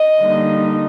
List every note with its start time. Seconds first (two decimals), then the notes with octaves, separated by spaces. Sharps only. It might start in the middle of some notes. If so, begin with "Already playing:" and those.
Already playing: D#5
0.21 D3 G3 A#3 D#4